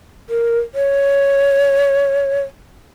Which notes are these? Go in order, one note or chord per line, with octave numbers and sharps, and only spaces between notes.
A#4
C#5